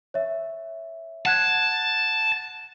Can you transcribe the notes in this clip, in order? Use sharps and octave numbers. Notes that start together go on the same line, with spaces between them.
C#5 E5
F#5 A5 F#6 G#6